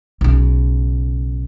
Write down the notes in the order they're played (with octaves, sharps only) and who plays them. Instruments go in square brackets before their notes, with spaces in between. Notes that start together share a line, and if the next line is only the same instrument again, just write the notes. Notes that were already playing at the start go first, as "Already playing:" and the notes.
[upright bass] B1 C#3